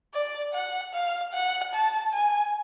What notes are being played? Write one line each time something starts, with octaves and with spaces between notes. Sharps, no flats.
D5
F#5
F5
F#5
A5
G#5